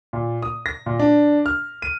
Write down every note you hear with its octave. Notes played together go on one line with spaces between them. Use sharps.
A#2
D#6
A#6
A#2
D4
F6
D#7